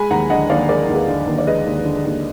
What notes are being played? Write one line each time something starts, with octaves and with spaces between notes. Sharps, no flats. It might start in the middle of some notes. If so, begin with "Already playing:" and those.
Already playing: G#3 G#5 B5
D#2 F#5 A#5
D3 D#5 F#5
D#2 D5 F5
G#3 A#4 D5
D#2
G#4 B4
D3
D#2
D5
G#3 B4 D#5
D#2
D3
D#2